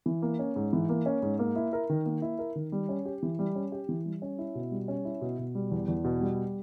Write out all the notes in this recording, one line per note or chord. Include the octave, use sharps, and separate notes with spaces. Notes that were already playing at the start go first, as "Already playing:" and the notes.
E3
A#3
C#4
G#2
E3
A#3
C#4
G#2
A#3
E4
A#4
D#3
A#3
E4
A#4
D#3
G3
C#4
G4
E3
G3
C#4
G4
E3
G3
C#4
E4
B2
G3
C#4
E4
B2
B2
G3
E2
E2
B2
G3